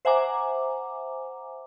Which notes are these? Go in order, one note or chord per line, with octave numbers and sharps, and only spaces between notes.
C5 E5 F#5 G#5 A#5 D6